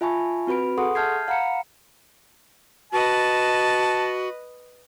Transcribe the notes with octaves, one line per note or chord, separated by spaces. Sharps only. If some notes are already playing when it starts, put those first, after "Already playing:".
F4 E5 G#5 A5 B5 C#6
C4 F#4 B4 B5 D7
G#4 A4 F#5 C6 C#6 D#6
E5 A5 F6 G6 G#6 C7
F5 F#5 A#5 B5 C#7
F#4 B4 D#5 A5